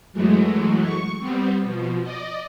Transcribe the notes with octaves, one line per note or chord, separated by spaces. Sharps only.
F#2 E3 F#3 G#3 A3
C#6
G3 B3 C4
B2 F3
D5 D#5